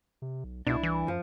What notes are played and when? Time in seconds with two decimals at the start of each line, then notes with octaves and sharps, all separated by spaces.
0.22 C3
0.44 B1
0.67 C2 B2 D4 E4
0.83 E3
1.08 F#2 F3